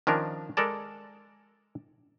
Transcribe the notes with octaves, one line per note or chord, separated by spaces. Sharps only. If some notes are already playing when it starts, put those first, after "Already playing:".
D#3 F3 C#4 D4 A#4
G#3 A4 A#4 D5 A5